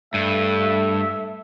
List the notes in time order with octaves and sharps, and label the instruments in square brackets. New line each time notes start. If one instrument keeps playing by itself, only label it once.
[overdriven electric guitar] G2 [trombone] A3 [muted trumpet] E5